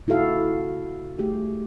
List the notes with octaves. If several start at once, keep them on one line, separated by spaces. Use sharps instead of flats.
C#3 E4 F#4 A4 F5
A3 G4 G#4